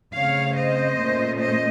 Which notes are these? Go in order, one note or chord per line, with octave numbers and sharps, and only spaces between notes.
C#3 A3 C4 C#5 F5
C5 D#5
A#2 A3 C#4
C5 D#5